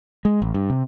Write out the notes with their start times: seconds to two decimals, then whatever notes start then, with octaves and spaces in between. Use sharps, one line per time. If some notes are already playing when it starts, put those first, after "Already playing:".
0.25 G#3
0.42 A1
0.54 G2
0.70 C3